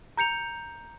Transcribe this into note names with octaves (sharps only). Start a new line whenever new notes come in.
A#5 G6 C#7 F7